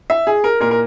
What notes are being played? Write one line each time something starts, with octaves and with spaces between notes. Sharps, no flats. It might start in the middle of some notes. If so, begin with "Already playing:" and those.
E5
G#4
A#4
A#2 A#4
A#4